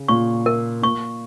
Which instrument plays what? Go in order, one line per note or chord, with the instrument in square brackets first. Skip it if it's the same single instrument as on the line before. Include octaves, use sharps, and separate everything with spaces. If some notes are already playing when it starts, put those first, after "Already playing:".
Already playing: [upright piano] C#3
[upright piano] A#2 [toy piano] C#6
[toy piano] A#4
[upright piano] A#2 [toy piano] C#6